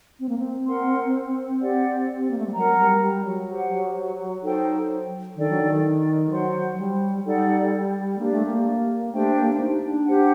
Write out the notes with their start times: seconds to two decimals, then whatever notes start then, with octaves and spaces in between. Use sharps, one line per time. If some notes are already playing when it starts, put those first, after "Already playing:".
0.20 C4
0.29 A#3
0.38 C4
0.67 A#4 F#5 C6
1.61 G4 D5 F#5
2.31 A#3
2.38 A3
2.47 G3
2.54 F#3 A#4 F#5 A#5
2.78 G3
3.01 G3
3.25 F#3
3.48 G4 C5 F#5
4.43 D#4 A4 C5 G5
5.36 D#3 D4 A4 D5 G5
5.50 F#3
5.63 D#3
6.30 F#3 C5 F#5 C6
6.78 G3
7.24 G3 D#4 A4 D5 F#5
8.18 A#3 D4 G4 D5
8.32 A3
8.47 A#3
9.13 A3 D4 G4 C5 G5
9.36 A#3
9.53 D4
9.60 D#4
9.83 D4
10.07 G4 C5 F#5